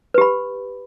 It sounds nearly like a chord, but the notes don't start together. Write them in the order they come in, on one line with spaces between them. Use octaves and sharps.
B4 G4 B5